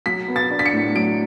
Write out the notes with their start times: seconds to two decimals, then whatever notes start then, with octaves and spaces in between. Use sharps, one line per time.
0.06 F#3 B6
0.28 B3
0.36 A6
0.51 D4
0.59 B6
0.66 C#7
0.73 A2
0.95 F#3 D7